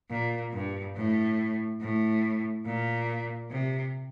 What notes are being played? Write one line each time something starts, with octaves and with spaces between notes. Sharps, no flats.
A#2
G2
A2
A2
A#2
C3